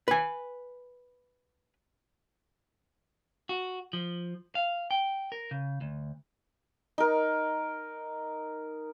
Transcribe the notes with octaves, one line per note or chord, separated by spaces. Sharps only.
B4 G#5
F#4
F3
F5
G5
A#4
C#3
D2
D#4 A#4